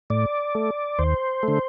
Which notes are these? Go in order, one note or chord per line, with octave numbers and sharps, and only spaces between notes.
A2 D5
A3
D#2 C5
D3 A3